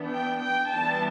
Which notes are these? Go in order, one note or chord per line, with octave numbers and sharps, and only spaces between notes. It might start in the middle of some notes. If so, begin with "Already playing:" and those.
Already playing: E3 B3 D4
G5
G5
E3 G3 B3 D4 A5